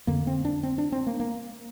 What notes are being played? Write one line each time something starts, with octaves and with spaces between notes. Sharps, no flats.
F2 D3 A#3
C4
D4
C4
D4
C4
A#3
A#3